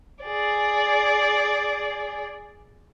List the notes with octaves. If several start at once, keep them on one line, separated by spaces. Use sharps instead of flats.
G#4 D5